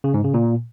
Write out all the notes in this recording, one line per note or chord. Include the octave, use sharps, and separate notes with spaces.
C#3
G#2
C#3
A#2